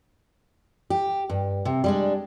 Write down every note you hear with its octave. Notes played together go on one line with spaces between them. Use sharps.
G4
G2
C3
G3 G#3 D4